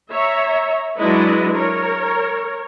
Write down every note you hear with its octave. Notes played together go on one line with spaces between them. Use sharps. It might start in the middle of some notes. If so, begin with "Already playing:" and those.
C#5 E5 A#5
F#3 G#3 D4 E4 B4 D#5
A#4 C#5